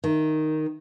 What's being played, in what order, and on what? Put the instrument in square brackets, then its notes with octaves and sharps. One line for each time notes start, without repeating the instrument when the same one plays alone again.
[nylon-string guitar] D#3